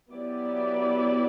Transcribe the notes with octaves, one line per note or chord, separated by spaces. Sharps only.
F#3 B3 E4 G4 D5